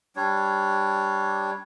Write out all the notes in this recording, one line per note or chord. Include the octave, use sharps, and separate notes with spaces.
G3 D4 C#5